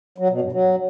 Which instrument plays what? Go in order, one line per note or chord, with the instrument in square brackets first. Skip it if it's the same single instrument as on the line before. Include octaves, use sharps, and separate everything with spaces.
[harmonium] F#3
B2
G2
F#3